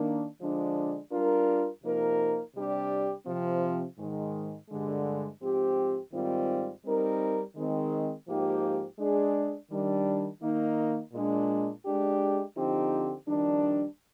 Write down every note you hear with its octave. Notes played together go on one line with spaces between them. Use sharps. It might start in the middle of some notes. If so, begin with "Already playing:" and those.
Already playing: D#3 A#3 D4
D3 F3 G#3 D4
G3 D4 F4 A#4
C3 F3 A#3 D#4 A#4
C3 G3 D4 G4
C3 F3 C4
G#2 D#3 G#3
G2 D3 G#3
G#2 F3 C4 G4
G#2 D#3 G3 C4 F4
G3 C4 D#4 A#4
D#3 G#3 C4
G#2 F3 A#3 D#4 G4
G#3 D4 G#4
D#3 G3 D4
D#3 A#3 D#4
A#2 G#3 D4
G#3 D4 G4
D3 F3 C4 D#4 G4
F2 D#3 G3 D4